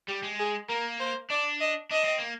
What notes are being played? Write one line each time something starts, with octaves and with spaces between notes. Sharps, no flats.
G3 G4
G#3
G#4
A#3 A#4
C5
D4 D5
D#5
D4 D#5
C4
A#3